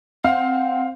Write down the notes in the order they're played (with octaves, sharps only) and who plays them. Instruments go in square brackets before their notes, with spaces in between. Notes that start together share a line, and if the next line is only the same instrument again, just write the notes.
[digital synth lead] C4 [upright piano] F5 [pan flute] F#5